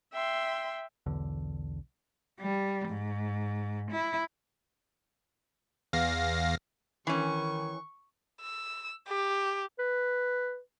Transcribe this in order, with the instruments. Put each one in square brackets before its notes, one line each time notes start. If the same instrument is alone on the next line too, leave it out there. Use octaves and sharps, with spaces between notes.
[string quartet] E5 G5 C6
[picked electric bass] B1 E2 D3
[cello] G3
G#2
E4
[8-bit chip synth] E2 F5 A#6
[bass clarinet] D#3 [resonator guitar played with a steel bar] E3 C#4 [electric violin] C#6
[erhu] E6
G4
[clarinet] B4